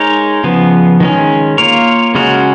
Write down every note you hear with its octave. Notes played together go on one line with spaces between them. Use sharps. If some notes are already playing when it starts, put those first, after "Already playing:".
Already playing: G#3 D#4 A#4 C#5
C#3 F3 B3
D#3 G#3 C#4
A#3 F4 A#4 C#5
C#3 G#3 C#4 F#4 A#4